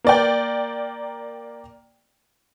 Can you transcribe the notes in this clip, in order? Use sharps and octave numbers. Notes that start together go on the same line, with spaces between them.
A#3 D5 G5